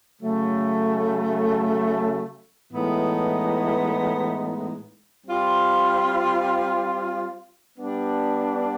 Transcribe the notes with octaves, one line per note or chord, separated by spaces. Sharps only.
C#3 F#3 A3
A2 E3 G#3 B3 D#4
G3 C4 F4
G3 B3 D4